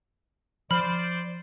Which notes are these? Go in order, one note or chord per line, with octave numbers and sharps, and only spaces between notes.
F3 C5 D5 B5 F6